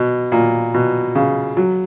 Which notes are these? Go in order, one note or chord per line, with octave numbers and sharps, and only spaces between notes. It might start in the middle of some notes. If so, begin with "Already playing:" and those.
Already playing: B2
A#2
B2
C#3
F#3